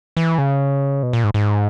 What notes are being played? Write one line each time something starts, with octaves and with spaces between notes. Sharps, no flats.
E3
C#3
B2
A#2
G#2
G#2